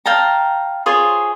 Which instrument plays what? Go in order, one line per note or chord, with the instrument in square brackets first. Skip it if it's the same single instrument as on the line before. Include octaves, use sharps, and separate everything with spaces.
[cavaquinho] F5 G5 A5 A#5
F4 G#4 C5 C#5